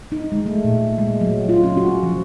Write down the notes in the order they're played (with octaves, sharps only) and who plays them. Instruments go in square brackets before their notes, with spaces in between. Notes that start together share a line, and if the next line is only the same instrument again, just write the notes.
[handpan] D#4
G#3
A3
A#2
G#3
F#3
F4
C#4
F#4
F3